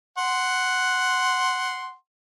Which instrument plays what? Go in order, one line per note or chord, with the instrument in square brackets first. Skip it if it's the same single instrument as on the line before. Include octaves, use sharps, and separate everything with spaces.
[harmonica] F#5 C6